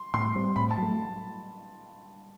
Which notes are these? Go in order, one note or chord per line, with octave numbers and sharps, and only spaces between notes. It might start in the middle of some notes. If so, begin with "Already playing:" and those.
Already playing: C6
A2 C6
G3 C4
A2 B5
A5
F#3 A3